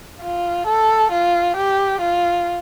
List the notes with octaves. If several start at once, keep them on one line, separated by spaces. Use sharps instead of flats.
F4
A4
F4
G4
F4